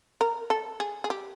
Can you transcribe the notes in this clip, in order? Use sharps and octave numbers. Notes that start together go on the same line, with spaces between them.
A#4
A4
G#4
G#4
G4